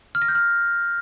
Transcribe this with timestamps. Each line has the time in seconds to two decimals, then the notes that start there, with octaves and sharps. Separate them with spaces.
0.15 F6
0.22 A#6
0.28 G6
0.35 F6